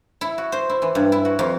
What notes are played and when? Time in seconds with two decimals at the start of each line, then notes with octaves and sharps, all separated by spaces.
0.21 E4
0.38 F#4
0.52 C5
0.69 E4
0.82 E3
0.95 G2
1.12 E4
1.25 F#4
1.39 F2